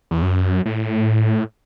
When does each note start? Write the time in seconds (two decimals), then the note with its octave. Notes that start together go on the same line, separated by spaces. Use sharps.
0.11 E2
0.22 F#2
0.66 A2